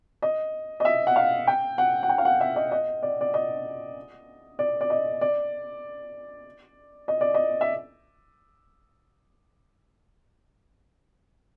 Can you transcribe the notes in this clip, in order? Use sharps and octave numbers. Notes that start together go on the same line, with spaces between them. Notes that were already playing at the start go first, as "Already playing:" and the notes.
D#5
D#5
E5
F#5
F5
G5
F#5
F#5
G5
F5
F#5
E5
D#5
D#5
D5
D5
D#5
D5
D5
D#5
D5
D#5
D5
D#5
E5